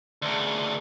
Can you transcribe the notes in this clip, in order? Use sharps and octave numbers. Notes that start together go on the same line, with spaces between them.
D2 C#3